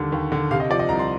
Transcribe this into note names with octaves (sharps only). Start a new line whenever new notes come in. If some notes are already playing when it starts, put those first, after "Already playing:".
Already playing: D#2 D3 G3
D#2
D3
C3 F5
D#5
F3 D5
D#5
C2 A#5
C6